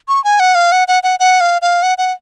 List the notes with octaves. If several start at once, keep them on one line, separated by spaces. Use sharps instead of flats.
C#6
G#5
F#5
F5
F#5
F#5
F#5
F#5
F5
F5
F#5
F#5